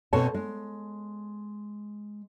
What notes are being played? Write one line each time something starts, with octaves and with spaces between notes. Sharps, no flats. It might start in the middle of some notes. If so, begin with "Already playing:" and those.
B2 C4 A4 C#5 A5
G#3